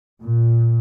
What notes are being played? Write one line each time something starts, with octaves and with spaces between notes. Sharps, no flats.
A#2